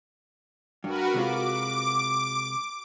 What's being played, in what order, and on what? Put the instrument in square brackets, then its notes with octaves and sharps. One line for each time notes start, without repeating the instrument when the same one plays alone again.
[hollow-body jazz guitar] G2 [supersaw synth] F#4 A#4 B4
[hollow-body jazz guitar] C3 G#3 F4 [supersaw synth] D6